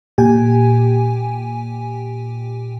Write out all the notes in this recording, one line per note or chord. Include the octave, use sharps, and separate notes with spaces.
A#2 G4 G5 G#5